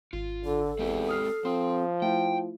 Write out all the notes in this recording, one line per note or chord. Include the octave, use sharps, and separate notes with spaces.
G#1 F4
D3 A4
E2 G#3 C4 G4
D#6 F6 C7
F3 C4 C6 D#6
A3 E4 F4 G5